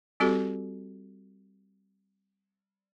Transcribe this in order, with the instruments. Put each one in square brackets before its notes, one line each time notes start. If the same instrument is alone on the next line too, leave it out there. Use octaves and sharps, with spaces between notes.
[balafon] G3 C4 F#4 G4 A4